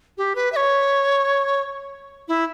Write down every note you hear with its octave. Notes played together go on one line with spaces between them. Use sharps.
G4
B4
E5
C#5
E4